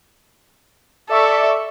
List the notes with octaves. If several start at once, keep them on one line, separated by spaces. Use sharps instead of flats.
A4 D5 E5 C#6